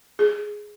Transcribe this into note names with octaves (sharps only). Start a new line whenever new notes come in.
G#4